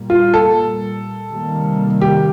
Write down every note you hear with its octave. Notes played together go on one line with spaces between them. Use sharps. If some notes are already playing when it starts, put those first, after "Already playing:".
Already playing: A#2 G3 A#3
F4
A4
C3 D#3 G3 A#3
G4